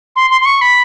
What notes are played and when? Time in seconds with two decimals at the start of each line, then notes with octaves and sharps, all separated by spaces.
0.16 C6
0.30 C6
0.41 C6
0.45 C#6
0.61 B5